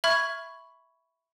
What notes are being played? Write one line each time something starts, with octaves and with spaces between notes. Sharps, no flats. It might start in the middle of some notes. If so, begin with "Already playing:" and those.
E5 B5 C#6 F6 G#6